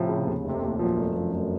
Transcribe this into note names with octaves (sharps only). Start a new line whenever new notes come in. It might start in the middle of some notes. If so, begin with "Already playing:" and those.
Already playing: A2 C3 F3
C#3
D#2
F1 A2 C3
D#2
F#2 A#2 F3
F1
F#2 F3
F1